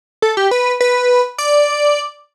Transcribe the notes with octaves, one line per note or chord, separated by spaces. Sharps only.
A4
G4
B4
B4
D5